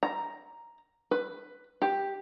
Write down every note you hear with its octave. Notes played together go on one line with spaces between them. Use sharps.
A#5
B4
G4